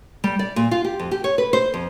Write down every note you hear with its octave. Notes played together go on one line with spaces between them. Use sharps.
G3
D5
A#2
F4
G4
F2
G4
C#5
B4
C5
F2